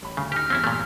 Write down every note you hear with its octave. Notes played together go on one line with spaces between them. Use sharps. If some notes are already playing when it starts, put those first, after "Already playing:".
A1 B5
D2 C#3
D#4 G4 F6
E2 G2 C4 C#4 E4
A#2 A3